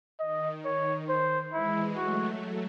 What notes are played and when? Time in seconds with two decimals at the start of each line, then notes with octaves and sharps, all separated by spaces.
0.20 D#3 D#5
0.65 C#5
1.09 C5
1.53 E3 G#3 E4
1.97 F#3 A3 F#4